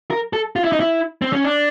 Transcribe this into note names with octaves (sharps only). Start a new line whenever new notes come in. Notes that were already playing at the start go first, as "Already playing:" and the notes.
A#4
A4
F4
E4
D#4
E4
C4
C#4
D4